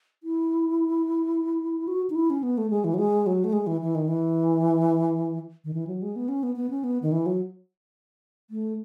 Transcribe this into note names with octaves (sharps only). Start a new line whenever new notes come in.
E4
F#4
D#4
E4
C#4
B3
A3
G#3
E3
F#3
G#3
F#3
A3
G#3
E3
E3
D#3
E3
D#3
E3
F#3
G#3
B3
C#4
B3
B3
C#4
B3
D#3
E3
F#3
A3